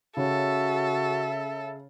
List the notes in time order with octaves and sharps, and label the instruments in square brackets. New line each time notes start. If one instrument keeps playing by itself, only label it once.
[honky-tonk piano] C#3 [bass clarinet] F#4 [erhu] A4 [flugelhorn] E5